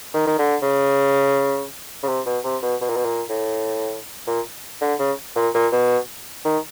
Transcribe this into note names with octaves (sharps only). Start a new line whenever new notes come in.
D#3
D#3
D3
C#3
C#3
C3
B2
C3
B2
B2
A#2
B2
A#2
A2
A#2
D3
C#3
A#2
A#2
B2
D#3